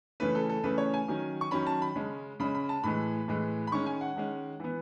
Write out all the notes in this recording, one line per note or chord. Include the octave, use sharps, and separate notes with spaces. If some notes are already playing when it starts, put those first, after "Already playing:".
C#3 E3 A3 C#4 B4
A4
A4
C#3 E3 A3 C#4 B4
C#5
G#5
D#3 F#3 C#4
C#6
D#3 F#3 C#4 B5
A5
B5
C#3 G#3 C#4
C#3 G#3 C#4 B5
B5
A5
A2 E3 G#3 B5
A2 E3 G#3
B5
D#3 G#3 C#4 C#6
G#5
F#5
D#3 G#3 C#4
E3 B3